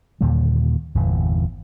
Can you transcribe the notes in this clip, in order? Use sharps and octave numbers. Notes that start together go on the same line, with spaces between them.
D#2 A#2 D3 G3
G1 E2 A#2 E3